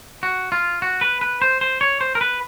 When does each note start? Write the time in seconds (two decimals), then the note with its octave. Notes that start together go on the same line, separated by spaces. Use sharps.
0.23 F#4
0.52 F4
0.82 F#4
1.01 B4
1.21 B4
1.42 C5
1.61 C5
1.81 C#5
2.01 C5
2.15 A#4
2.21 B4